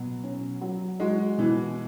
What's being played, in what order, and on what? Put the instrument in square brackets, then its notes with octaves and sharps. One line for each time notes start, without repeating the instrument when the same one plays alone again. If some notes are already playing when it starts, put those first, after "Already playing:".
Already playing: [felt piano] B2 [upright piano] F#3
[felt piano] C#4
F#3
[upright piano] G#3 [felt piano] F#4
[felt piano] B2 [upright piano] E3